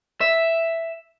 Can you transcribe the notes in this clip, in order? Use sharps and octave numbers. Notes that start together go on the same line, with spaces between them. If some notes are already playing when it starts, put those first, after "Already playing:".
E5